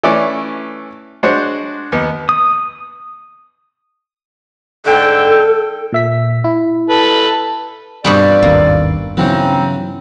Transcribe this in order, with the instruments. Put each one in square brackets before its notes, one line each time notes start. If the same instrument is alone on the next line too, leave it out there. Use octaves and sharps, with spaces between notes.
[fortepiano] E3 A3 C#4 D5
G#3 D4 F#4 C5 C#5
D#2 B3
[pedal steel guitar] D#6
[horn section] G#2 D3 G5 [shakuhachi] A4
[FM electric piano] A#2 E5 B6
E4
[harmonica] A4 B4
[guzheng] G2 B2 G3 [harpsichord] C4 B4 [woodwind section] F4 A4 D5
[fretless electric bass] G#1 D#2 [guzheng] A#3
[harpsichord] C#3 E3 B3 [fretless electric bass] F#3 [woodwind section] C4 D#4